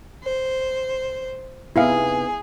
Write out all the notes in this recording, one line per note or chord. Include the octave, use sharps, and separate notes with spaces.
C5
C3 B3 D#4 E4 G#4 F5